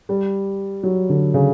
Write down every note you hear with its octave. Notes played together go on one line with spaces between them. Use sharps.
G3
F#3
D3
C#3